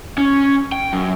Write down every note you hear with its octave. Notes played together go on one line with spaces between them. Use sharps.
C#4
G5
F#2